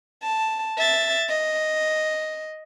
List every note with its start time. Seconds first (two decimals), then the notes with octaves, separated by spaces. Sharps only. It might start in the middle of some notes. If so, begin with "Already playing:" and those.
0.23 A5
0.78 E5 A6
1.29 D#5